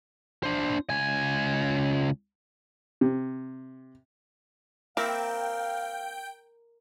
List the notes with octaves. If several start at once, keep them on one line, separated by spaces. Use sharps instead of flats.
D4 C5
C#2 G#5
C3
A#3 C4 E4 A#4 F5 G5